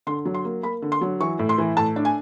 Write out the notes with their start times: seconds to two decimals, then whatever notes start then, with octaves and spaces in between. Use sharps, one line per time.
0.07 D3 C6
0.25 F#3
0.34 C6
0.45 A#3
0.63 A#3 B5
0.82 D3
0.92 C6
1.01 F#3
1.20 E3 C#6
1.39 A2
1.49 C6
1.58 E3
1.77 A2 A5
1.96 D4
2.05 G#5